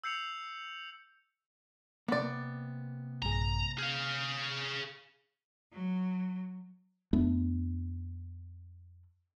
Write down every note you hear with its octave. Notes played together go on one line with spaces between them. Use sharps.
E6 G6 C7 C#7 F7
C3 A#3 B3 D5
A#1 G2 G#4 A#5
G#4 F5 F6 G6 A#6
F#3
F2 A3 B3 D4